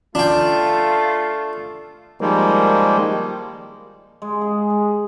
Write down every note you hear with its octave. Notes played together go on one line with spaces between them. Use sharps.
A3 D4 F4 G5
D#3 F3 G3 G#3 A#3
G#3
G#4
G#3